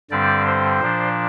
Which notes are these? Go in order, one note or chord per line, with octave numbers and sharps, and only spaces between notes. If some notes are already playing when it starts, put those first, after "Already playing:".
G2 D3 G3 C4 D5
C5
A#2 F3 D4